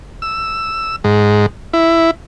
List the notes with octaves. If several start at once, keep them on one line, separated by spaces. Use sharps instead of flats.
E6
G#2
E4